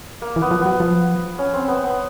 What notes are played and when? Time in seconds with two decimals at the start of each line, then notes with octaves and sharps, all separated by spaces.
0.22 A#3
0.36 E3
0.42 B3
0.51 F3
0.61 F#3 B3
0.80 F3
1.39 C#4
1.53 C4
1.68 B3
1.83 B3